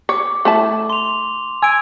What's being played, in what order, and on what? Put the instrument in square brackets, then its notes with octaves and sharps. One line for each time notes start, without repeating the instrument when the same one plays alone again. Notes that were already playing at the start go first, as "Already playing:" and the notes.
[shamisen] C#5 [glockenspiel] D6
[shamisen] A3 E4 A5
[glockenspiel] C6 F7
[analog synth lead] G#5 [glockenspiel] E6 D7